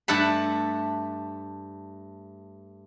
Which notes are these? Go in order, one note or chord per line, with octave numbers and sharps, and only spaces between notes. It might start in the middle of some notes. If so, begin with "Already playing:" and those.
G2 A3 E5 F#5 A5 B5